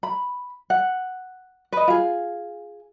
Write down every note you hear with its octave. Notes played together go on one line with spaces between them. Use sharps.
B5
F#5
B4 D#5
F4 G#4